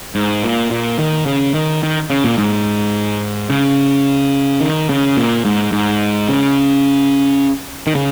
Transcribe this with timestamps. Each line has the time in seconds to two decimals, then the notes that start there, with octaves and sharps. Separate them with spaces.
0.15 G#2
0.44 A#2
0.71 A#2
0.99 D#3
1.26 C#3
1.54 D#3
1.83 D#3
2.10 C#3
2.24 A#2
2.38 G#2
3.50 C#3
4.61 D#3
4.89 C#3
5.17 A#2
5.45 G#2
5.72 G#2
6.29 C#3
7.87 D#3
7.95 C#3